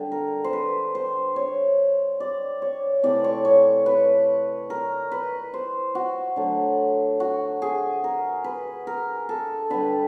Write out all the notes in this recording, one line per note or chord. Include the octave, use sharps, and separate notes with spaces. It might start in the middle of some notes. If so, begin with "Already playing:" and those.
Already playing: D3 G3
A#4
C5
B4
C5
C#5
D5
C#5
C3 E3 A3 D5
C#5
C#5
B4
A#4
B4
C5
F#4
D3 F#3 A3
F#4
G#4
A#4
B4
A#4
A4
D3 G3 B4